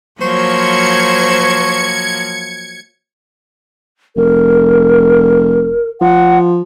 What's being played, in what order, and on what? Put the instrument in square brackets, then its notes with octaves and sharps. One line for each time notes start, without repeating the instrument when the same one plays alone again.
[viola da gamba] F3 F#3 A#3 [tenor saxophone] C5 [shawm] C#6 [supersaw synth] G#6 C#7
[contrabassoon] F1 [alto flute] A#4
[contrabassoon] F3 [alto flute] F#5